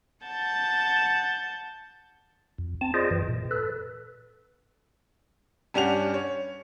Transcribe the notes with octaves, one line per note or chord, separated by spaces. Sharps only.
F#5 A5 G6 A6
F2
C4 A5
F4 G#4 C5 D5 D#5
F#2 E3
A#2
A4 B4
G2 C#4 D4 G4 F#5 F7
C#5